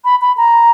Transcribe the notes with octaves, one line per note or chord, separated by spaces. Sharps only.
B5
B5
A#5